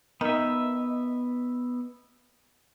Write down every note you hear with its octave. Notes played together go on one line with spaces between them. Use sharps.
D#3 B3 E5